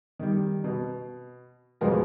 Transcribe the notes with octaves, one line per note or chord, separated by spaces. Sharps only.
D#3 G3
B2
A1 F2 B2 G#3 B3 A#4